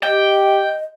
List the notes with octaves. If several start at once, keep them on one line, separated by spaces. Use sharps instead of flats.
G4 D#5 G5